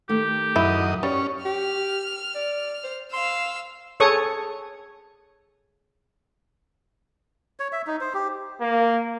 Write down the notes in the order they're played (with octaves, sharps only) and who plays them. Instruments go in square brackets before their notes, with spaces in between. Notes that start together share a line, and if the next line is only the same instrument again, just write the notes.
[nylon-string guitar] D#3 A3 [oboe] G4
[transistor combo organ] F#2 D#5 [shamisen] E4
[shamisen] G3 [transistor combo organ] C#4
[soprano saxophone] G4 [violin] F6
[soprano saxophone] D5
C5
[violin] F5 E6 [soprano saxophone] C6
[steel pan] G#4 A4 C#5 C#6 D#6
[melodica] C#5
E5
D#4
C5
G4
[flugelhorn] A#3